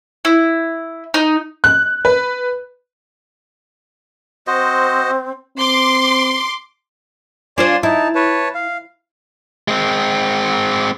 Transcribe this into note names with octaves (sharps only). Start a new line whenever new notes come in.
E4
D#4
F#6
B4
C4 F#4 C5 D#5
C4 C6 D6
D4 F4 C5 D5 G#5 C6
D#4 E4 A5
B4 C#5 A5
F5
G#3 C4